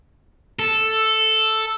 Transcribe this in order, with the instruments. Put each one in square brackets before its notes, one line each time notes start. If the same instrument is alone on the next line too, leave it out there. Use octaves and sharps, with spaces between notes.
[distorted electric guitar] A4